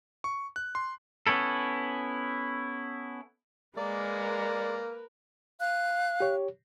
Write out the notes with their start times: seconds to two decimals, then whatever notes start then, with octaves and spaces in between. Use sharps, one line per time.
0.24 C#6
0.56 F#6
0.75 C6
1.27 B3 C#4 E4 A4
3.77 G#3 A#3 A#4 B4 D5
5.60 F5 F#6
6.20 G4 C#5